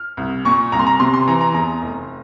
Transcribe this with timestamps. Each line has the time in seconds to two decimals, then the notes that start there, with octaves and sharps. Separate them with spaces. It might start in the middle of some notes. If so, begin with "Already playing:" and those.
Already playing: F6
0.17 C2
0.45 A#2 C#6
0.72 C2 A#5
0.79 C6
0.87 A#5
1.00 C3 C6
1.14 C6
1.27 E3 A#5
1.41 A#5
1.54 E2 A#5
1.82 F1